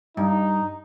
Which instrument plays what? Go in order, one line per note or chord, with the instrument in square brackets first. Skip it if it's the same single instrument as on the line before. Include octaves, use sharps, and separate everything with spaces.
[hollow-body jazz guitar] G2 [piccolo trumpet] D#4